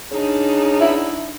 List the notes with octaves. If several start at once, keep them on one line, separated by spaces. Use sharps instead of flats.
C#3 D4 D#4
E4